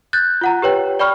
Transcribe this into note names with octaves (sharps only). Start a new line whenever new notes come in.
F#6 G6 A6
F4 F#5 A#5
G4 B4 C#5 G5
D5 G5 B5 C#6 F6